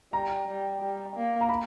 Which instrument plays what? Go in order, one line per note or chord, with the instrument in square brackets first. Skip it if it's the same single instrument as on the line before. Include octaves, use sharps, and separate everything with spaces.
[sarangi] G3 [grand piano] A#5
[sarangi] G3
G3
A#3
[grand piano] A#5
B5